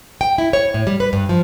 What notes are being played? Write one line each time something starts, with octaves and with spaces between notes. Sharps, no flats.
G5
E4
C#5
A2
G3
B4
G2
F3